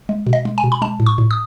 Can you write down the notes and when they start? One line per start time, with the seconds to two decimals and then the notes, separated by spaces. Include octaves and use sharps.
0.09 G#3
0.27 B2
0.33 D#5
0.45 G#3
0.58 G#5
0.64 B2
0.72 B5
0.82 G#3 A5
1.00 A2
1.06 C#6
1.18 A2
1.31 D#6